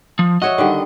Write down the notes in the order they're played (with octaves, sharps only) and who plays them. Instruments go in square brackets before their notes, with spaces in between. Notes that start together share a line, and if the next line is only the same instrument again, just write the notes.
[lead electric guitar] F3
[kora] F#4 C#5 E5 [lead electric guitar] D#5
[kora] D3 D#3 G3